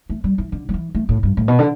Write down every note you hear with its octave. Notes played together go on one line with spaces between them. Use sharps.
A3
G3
E3
D3
G3
E3
A3
A2
G2
A2
B2
D3